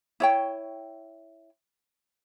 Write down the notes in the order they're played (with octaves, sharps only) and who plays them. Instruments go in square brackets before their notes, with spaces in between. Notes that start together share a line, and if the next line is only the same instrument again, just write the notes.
[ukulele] E4 C#5 G5